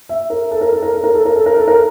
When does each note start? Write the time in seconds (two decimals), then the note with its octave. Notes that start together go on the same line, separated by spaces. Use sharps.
0.09 E5
0.30 A#4
0.51 A4
0.61 A#4
0.72 A4
0.82 A#4
0.94 A4
1.03 A#4
1.14 A4
1.25 A#4
1.36 A4
1.46 A#4
1.56 A4
1.67 A#4